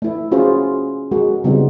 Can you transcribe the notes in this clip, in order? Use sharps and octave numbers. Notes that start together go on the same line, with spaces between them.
A3 E4
C#4 F4 F#4 G#4 C5
G#3 F#4 G#4 A#4
C#3 G3 B3 C4 D#4 F4